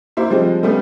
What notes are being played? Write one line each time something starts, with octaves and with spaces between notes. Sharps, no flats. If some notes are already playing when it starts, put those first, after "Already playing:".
A#3 E4 C5
F3 G3 G#3 C4
G3 A3 B3 C#4